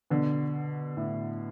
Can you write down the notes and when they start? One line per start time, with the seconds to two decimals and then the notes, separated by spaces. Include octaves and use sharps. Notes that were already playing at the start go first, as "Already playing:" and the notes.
0.10 B2 D3
0.97 A2